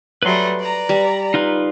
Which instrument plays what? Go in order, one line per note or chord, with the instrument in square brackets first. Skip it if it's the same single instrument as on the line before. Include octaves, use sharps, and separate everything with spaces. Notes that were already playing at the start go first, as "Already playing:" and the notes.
[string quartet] F#3 G3 A3 [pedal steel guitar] B4 C6
[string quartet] D5 A#5
[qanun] G3
[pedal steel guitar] D#4 F4 B4